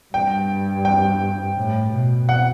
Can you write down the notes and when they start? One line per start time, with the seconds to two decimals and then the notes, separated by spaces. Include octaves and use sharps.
0.14 G2 G5
0.85 G5
1.57 A2
1.93 B2
2.29 F#5